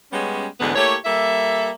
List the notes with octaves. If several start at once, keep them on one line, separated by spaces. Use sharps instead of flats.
G3 G#3 B3 C#4
D2 G#2 D3 E3 G#3 B3
A3 A#3 E4 G4 C#5
G3 A#3 A4 E5